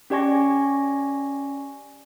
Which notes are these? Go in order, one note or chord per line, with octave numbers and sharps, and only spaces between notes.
C#4 G4 D5 G#5 C#6 A#6